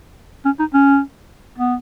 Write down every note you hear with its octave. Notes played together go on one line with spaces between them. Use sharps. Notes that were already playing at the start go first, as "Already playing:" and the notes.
C#4
D#4
C#4
B3